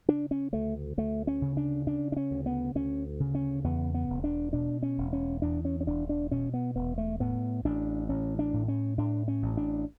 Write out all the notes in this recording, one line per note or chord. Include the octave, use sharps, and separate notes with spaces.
C#3 D4
C#4
D2 A3
D2 A3
C#4
C#3
D4
C#3 D4
D4
C#4
D2
B3
D2 C#4
C#3
C#4
E2 B3
B3
E1
D4
B2 D4
C#4
E1
C#4
E2 D4
C#4
C#4
E1 D4
D4
B2 C#4
B3
E1 B3
A3
A2 B3
A1 D4
A1 C#4
D4
A2
C#4
A2 D4
C#4
A1
D4